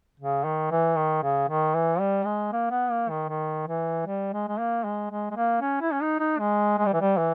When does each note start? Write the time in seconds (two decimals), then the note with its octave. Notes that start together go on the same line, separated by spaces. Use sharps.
0.20 C#3
0.44 D#3
0.71 E3
0.96 D#3
1.23 C#3
1.48 D#3
1.74 E3
1.99 G3
2.25 G#3
2.52 A#3
2.70 B3
2.91 A#3
3.09 D#3
3.28 D#3
3.67 E3
4.06 G3
4.33 G#3
4.48 G#3
4.59 A#3
4.84 G#3
5.10 G#3
5.31 G#3
5.35 A#3
5.61 C#4
5.81 E4
5.92 C#4
6.01 D#4
6.19 D#4
6.39 G#3
6.78 G#3
6.86 G3
6.93 E3
7.01 G3
7.17 E3